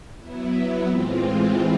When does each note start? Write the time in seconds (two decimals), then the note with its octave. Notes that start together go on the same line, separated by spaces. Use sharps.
0.20 F#3 B3 E4
0.87 A2 E3 G#3 C4 F4